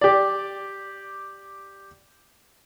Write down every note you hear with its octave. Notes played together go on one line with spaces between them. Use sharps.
G4 D5